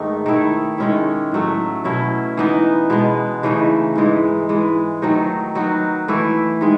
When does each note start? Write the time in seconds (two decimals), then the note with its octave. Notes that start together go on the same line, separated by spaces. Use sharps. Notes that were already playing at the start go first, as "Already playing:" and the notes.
Already playing: G#2 D#3 A3 B3 D#4
0.26 D#3 A3 E4
0.78 D#3 G#3 C#4 E4
1.32 A2 F#3 A3
1.84 B2 F#3 C#4 E4
2.37 E3 B3 D#4
2.90 B2 G#3 B3
3.43 C#3 E3 A3 D#4
3.96 G#2 E3 G#3 D#4
4.49 E3 G#3 B3
5.02 D#3 F#3 A3 D#4
5.55 F#3 B3 D#4 F#4
6.08 E3 A3 E4
6.61 D#3 G#3